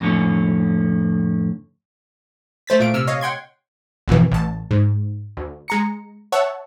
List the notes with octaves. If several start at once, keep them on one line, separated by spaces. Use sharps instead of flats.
F2 A2 D3 C#4
A3 C5 A6 B6
A#2 A3 F5 D7
C3 E6 F6
C#5 D#5 F5
F#5 G5 C6 G#6
G#1 F2 B2 E3
A1 A5
G#2
D2
G#3 A#5 C#7
C#5 E5 F#5 A5